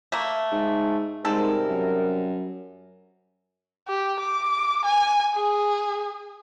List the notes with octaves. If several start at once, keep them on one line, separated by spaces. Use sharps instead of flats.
A3 A#3
G#2
G#2 C3 G3 C4 A4 A#4
F#2
G4
D6
G#5
G#4